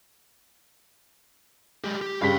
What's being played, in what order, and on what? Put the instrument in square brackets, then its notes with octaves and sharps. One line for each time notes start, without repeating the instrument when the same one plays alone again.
[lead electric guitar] G#3 G4
G4
[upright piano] G2 C#3 B6 [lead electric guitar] F5 G5